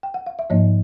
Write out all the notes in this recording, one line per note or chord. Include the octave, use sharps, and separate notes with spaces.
G5
F#5
F5
E5
G#2 F3 A#3 D#4 C#5 D#5